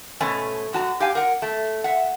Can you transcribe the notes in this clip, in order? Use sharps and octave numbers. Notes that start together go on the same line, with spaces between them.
G#2 B2 A3 C#4 G#5
F#2 F#4 A5 A#5
G4 F5 G#5
A#4 F#5
A3
E5 F#5